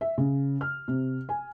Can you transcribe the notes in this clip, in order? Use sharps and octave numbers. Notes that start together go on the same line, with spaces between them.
E5
C#3
F6
C3
G#5